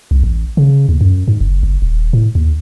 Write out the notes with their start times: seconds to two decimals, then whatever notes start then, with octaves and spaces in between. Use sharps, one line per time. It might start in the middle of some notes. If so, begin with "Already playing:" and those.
0.11 C2
0.24 A1
0.57 C#3
0.89 D#2
1.01 F#2
1.28 G#2
1.41 F#1
1.63 F#1
1.82 D#1
2.13 A2
2.35 D#2